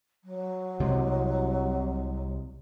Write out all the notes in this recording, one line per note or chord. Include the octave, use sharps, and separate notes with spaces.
F#3
C2 C3 G#3